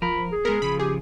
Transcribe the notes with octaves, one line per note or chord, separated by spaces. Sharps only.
F3 A#4 B5
G#4
G#3 B3 A#4
C#3 F3 B5
G4 G#4